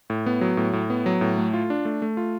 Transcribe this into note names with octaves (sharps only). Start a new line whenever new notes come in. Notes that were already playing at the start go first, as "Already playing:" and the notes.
A2
B3
F#3
A2
A2
B3
F#3
A2
A3
F4
D4
A3
A3
F4